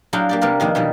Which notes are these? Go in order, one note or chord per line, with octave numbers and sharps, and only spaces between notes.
F#3 D4 E4 G#4 F5 G5
A#3 G4 D5
C3 G3 A#3 B3 A#4 D5
F2 D#3 A#3 D4
B2 D#3 E3 G3